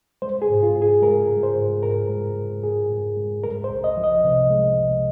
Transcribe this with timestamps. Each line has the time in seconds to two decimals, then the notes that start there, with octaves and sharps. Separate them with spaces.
0.22 G#3 C5
0.42 G#4
0.49 G#2
0.63 F4
0.76 G#2
0.82 G#4
1.02 G#3 A#4
1.29 G#3
1.43 C5
1.56 G#2
1.82 G#2 A#4
2.09 G#3
2.37 G#3
2.63 G#2 G#4
2.90 G#2
3.16 G#3
3.44 G#3 A#4
3.64 C5
3.70 C2
3.84 D#5
3.97 F3
4.04 D#5
4.24 C3
4.50 G#3
4.78 C2